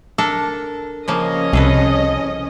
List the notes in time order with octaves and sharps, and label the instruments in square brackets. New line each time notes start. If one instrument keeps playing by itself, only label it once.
[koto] D4 A4 A#4
[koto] C#3 F3 A#3 [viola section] C#4 D#5
[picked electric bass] C2 [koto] G#4 A4 B4